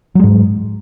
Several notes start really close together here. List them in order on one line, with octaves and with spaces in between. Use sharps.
F#3 G#3 G#2